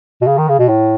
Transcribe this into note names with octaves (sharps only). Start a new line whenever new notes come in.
B2
C#3
D#3
C#3
B2
A2